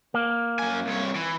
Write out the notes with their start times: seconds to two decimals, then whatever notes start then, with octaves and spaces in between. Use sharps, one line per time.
0.14 A#3
0.59 F#2 G#5
0.87 C2 C#5
1.15 E3